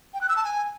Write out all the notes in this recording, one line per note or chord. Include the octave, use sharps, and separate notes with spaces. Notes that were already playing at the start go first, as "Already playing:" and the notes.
G5
F#6
E6
A5
G#5